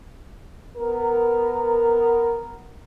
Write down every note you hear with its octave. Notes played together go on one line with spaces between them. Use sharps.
B3 A#4